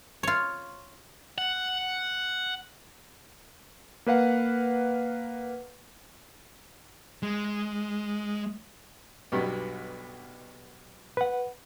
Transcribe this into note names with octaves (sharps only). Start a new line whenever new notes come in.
F4 C#5
F#5
A#3 B4 F5 F#5
G#3
B1 G2 B2
B4 F#5